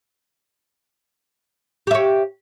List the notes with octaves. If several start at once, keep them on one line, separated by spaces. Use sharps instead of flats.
G4 C#5 E5